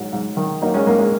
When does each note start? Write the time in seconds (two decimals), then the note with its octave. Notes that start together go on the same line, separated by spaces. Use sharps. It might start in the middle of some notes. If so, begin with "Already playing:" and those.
Already playing: G#2 F#3
0.13 G#2
0.37 D#3
0.62 F#3 A#3 D#4
0.74 G#3 C#4
0.87 G#2 A#3
0.99 G#3